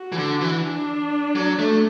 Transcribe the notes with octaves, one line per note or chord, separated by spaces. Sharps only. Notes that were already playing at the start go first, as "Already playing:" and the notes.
Already playing: F#4
E3
D3
E3
D4
F#3
A3